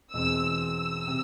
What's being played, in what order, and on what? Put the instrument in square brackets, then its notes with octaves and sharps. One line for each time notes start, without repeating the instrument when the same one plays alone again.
[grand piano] E2 B2 G#3 C4 [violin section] E6
[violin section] E6
[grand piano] C3